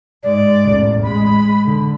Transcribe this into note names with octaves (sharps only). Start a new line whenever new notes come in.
G#2 G#3 D5
A1 E2
G#3 B5
D3